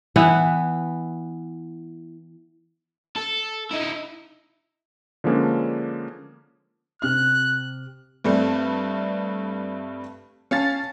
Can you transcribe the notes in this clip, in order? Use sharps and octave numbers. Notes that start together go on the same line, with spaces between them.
E3 B3 E4
A4
D#4 E4
D3 F3 G#3 A#3 C#4 D4
C3 F6 F#6
G2 G3 A3 C4
C#4 F5 A5 A6